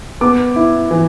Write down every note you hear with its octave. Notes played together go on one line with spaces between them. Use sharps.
B3 D6
E4
E3